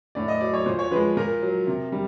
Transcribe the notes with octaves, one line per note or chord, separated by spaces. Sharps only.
A2 D5
D#5
F#3 D5
C#5
A#2 C5
C#5
F3 G#3 B4
A#2 A#4
F#3
C3
G3